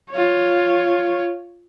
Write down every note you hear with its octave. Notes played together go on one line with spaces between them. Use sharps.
F4 C#5